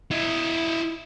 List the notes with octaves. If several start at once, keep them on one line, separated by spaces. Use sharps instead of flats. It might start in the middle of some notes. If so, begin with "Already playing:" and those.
E4 D#5